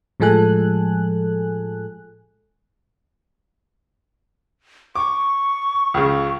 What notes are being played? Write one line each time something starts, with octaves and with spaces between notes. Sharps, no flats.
A2 F3 G#3 A4 G#5 F#6
C#6 D6
C#2 C#3